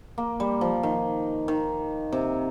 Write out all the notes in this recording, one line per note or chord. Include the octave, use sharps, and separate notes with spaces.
A#3
G3
F3
D#3
D#3
C3